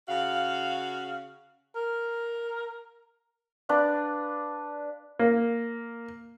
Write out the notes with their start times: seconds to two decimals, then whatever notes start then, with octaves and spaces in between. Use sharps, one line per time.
0.08 C#3 F#4 F5
1.75 A#4
3.69 D4 B4 D5 F5
5.19 A#3